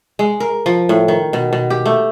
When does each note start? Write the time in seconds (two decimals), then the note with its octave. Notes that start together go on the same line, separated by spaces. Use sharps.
0.19 G#3
0.40 A#4
0.66 F3
0.89 A2
1.08 D#3
1.33 B2
1.53 B2
1.70 G4
1.86 A3